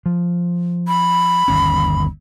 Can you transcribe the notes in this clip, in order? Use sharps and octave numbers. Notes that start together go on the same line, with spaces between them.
F3
B5
G1 D#2 C#4